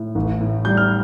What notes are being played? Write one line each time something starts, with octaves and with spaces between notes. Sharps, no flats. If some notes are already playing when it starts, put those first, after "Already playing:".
Already playing: A2
A1
A2
G3 G6
F6